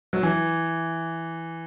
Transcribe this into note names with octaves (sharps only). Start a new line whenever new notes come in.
F#3
E3